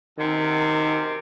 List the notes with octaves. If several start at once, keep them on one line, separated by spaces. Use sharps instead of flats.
F#2 C3 D#3